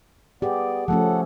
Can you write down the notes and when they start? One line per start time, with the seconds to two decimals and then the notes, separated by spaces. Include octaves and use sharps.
0.42 B3 G4 G#4 D5
0.88 F3 A3 C#4 A4 F#5